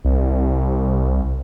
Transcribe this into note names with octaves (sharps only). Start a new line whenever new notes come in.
C2